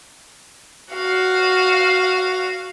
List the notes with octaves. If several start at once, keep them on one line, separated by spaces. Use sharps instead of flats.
F#4 F5